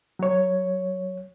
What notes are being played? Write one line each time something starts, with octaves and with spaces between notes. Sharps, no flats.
F#3 C#5